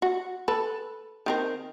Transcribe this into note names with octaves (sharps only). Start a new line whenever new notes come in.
F#4
A4 B4
D#3 C4 A#4